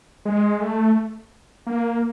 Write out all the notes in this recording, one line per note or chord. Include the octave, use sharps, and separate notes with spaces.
G#3
A3
A#3